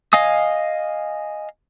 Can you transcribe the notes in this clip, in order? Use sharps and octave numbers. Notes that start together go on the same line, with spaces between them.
D#5 F5 G#5 D#6